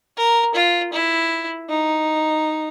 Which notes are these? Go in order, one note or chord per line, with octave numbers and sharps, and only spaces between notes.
A#4
F4
E4
D#4